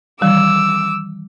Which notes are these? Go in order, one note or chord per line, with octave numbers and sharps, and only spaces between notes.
D#3 E3 G3 D6 E6